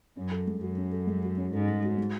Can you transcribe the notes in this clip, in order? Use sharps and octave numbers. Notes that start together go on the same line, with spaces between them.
F#2 C#4
A4
G#3
F#2 F#4
C#4
A4
G#3
F#4
C#4
G#2 A4
G#3
F#4
G#3